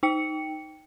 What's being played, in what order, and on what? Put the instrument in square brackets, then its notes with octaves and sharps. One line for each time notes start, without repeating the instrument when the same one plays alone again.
[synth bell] D#4 G5 C#7